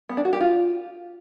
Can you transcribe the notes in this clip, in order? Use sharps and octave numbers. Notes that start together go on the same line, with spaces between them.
B3
D4
F#4
G4
F4